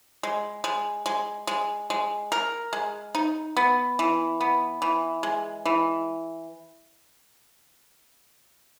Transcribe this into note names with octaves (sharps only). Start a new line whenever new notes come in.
G#3
G#3
G#3
G#3
G#3
A#4
G#3
D#4
B3
E3
B3
E3
G#3
E3